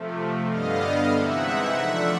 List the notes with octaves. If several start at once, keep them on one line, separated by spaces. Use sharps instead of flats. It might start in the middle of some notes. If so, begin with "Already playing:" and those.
Already playing: C3 F3 A3
G2 D3 G3 B3 D#5 F5
C3 E3 G#3 C4 D#4 E5 F#5
D3 F3 A3 D4